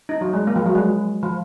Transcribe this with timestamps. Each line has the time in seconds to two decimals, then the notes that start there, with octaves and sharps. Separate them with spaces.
0.09 D#4
0.21 F#3
0.33 G#3
0.47 A#3
0.56 F3
0.66 F#3
0.75 G#3
1.23 F3